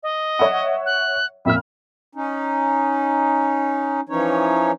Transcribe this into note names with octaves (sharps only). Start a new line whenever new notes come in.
D#5
C#5 E5 F#5
F#6
F2 A#2 E5 F6
C#4 D#4
E3 F3 C#4 D#4 C#5